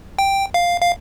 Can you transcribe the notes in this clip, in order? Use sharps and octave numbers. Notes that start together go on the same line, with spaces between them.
G5
F5
F5